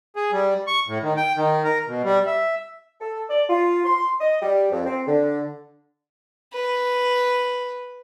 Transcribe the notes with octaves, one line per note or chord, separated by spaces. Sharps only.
G#4
G3
C#6
A2
D#3
G5
D#3
A#4
B2
G3
E5
A4
D5
F4
C6
D#5
G3
F2
C4
D3
B4